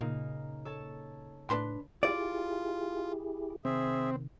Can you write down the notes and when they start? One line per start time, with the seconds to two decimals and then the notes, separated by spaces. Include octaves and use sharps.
0.01 A#2 C#3 A#3 D#4
0.65 A4 C#5 A5
1.50 A2 D4 B4 C6
2.03 E4 F4 G4 G#4 D5
3.65 C3 D#3 C4 G#4 E5